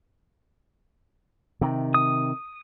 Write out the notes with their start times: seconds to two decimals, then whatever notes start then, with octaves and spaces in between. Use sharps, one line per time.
1.61 C3 D#3
1.94 D#6